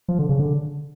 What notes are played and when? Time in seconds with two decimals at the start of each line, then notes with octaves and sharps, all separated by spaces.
0.08 F3
0.19 D3
0.29 C#3
0.39 D3